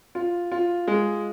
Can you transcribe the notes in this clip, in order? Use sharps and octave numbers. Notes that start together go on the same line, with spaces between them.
F4
F4
G#3